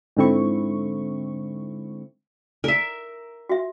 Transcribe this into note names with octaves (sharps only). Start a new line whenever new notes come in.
G#2 D3 C4 E4 C#6
A#4 E5
F#4 E5